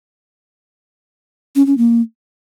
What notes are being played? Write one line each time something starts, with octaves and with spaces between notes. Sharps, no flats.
C#4
C#4
A#3